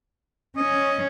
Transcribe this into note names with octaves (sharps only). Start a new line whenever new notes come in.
C#4 D#5